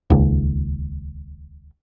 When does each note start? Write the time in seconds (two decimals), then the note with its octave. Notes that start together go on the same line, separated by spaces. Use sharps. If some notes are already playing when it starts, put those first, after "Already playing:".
0.10 D#1 C#2